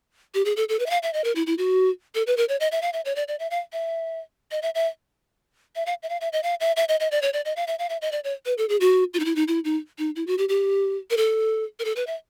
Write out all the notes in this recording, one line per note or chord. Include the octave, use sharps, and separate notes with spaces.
G4
G#4
A4
A4
B4
E5
F5
E5
D#5
A#4
E4
E4
F#4
A4
B4
A#4
C#5
D#5
E5
F5
E5
C#5
D5
D5
E5
F5
E5
D#5
E5
E5
E5
F5
E5
F5
E5
D#5
F5
E5
E5
D#5
D#5
D5
C#5
D5
D#5
F5
E5
F5
E5
D#5
D5
C#5
B4
A4
G#4
F#4
F4
D#4
E4
D#4
E4
D#4
D#4
E4
F#4
G4
G4
A#4
A4
A#4
A4
B4
E5